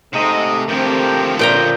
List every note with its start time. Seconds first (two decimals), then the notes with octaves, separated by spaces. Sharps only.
0.14 G#2 C3 A3 D#5
0.68 D3 E3 F3 A3 C4 G4 A#4 C5
1.39 A#2 C#3 C#4 F4 G5 A#5